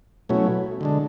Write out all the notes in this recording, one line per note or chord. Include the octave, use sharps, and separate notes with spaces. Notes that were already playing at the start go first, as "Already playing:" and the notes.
B2 F#3 A3 C#4 E4
D3 G#3 D4